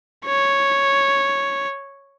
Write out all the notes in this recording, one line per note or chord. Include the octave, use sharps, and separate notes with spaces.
C#5